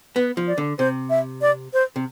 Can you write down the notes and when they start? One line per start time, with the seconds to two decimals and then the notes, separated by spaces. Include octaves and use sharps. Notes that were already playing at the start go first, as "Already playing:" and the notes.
0.16 B3 B4
0.37 F3
0.47 D5
0.58 D3
0.79 C3 C5
1.10 E5
1.42 D5
1.73 C5
1.96 C3